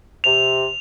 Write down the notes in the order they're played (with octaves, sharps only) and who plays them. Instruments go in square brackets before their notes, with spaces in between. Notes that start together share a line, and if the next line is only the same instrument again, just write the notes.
[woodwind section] C3 [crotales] F7